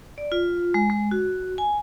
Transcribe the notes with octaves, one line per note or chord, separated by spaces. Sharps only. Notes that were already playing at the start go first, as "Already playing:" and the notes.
D5
F4
G#3
G#3
F#4
G#5